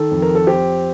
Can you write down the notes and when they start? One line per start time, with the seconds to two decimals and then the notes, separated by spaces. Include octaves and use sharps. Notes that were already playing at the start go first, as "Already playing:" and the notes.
Already playing: D#3 A4
0.11 F2
0.22 A#4
0.35 A4
0.47 C4 G4